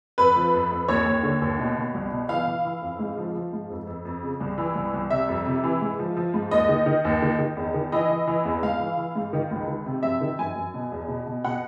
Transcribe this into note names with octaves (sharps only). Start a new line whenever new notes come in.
F2 B4
F3
F2
F2
D#2 C#5
D#2
D3
D#2
B2
B2
C2
B2
E3 F5
E3
E3
F2
G#2
F3
F3
G#2
F2
F2
F2
C#3
C2
E3
C2
C2
C3 E5
F2
C3
E3
G#2
F3
F3
G#2
D#2 D#5
D#3
D#3
D#2
D#3
D#3
E2
D#3
E3 D#5
E3
E3
E2
G#2 F5
E3
E3
G#2
D#3
C#2
D#3
C3
F#2 E5
D#3
F#2 G#5
F#2
B2
E2
B2
B2
B2 F#5